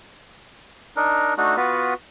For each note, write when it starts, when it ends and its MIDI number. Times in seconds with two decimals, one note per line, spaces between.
0.96 1.34 62
0.96 1.34 63
0.96 1.34 70
1.38 1.56 57
1.38 1.56 62
1.38 1.56 63
1.38 1.56 66
1.57 1.94 59
1.57 1.94 65
1.57 1.94 66
1.57 1.94 71